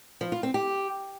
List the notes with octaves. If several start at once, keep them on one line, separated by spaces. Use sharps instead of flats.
F3
F4
C4
G4